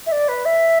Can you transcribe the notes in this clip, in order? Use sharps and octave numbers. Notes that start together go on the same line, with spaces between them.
E5
D5
B4
E5